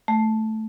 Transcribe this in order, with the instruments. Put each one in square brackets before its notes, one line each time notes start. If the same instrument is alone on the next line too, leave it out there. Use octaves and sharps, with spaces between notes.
[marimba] A3